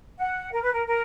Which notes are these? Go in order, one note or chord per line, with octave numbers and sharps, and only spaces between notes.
F#5
A#4
B4
A#4
A#4